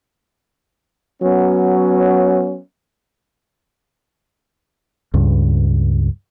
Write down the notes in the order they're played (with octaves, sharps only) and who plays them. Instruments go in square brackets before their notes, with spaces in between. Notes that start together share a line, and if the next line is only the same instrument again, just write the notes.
[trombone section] F#3 B3 C#4
[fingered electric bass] C#2 G2